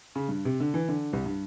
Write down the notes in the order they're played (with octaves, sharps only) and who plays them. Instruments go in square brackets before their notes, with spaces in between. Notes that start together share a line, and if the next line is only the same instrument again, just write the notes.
[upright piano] C#3
G2
C3
D3
E3
D3
C2
G2